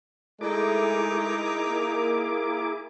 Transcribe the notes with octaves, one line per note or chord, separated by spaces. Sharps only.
G#3 A3 D#4 E4 G#4 A#4 D6
A#3